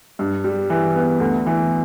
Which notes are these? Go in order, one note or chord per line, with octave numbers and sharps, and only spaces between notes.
G2
G3
E3
B3
D2
E3